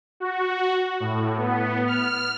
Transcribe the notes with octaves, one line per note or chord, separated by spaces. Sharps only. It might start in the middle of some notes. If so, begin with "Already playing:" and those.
F#4
A2
B3
F6